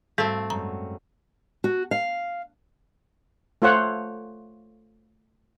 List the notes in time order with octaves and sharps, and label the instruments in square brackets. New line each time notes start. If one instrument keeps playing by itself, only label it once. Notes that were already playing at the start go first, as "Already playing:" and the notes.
[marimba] G#2 G3 [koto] A3 C4 [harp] F5
[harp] F#2 G3 G#3 [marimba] A#5
[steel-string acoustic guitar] F#4
F5
[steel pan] A3 F4 C5 C#5 F#5